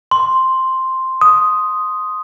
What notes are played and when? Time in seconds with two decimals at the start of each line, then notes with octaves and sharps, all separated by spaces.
0.11 C6
1.21 D#6